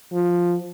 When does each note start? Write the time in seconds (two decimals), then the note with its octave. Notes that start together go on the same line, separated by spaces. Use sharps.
0.13 F3